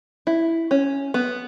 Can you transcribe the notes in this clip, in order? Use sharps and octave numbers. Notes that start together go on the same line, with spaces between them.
E4
C#4
B3